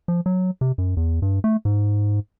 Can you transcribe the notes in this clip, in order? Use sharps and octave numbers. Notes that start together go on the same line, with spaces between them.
F3
F#3
C3
F#2
E2
G2
A3
G#2